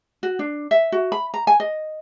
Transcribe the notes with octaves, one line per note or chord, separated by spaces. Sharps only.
F#4
D4
E5
F#4
B5
A#5
G#5
D#5